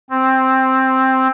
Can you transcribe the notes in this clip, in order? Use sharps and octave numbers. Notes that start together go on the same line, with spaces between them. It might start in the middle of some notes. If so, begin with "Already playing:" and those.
C4